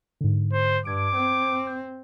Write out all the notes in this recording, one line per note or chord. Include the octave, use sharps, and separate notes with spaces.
G#2 D3
C5
G2 D6 G#6 D7
C4
G6